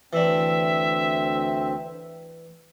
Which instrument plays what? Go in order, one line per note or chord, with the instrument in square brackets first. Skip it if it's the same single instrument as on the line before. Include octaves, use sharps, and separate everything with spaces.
[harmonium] D2 C4 [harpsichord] E3 D4 [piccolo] E5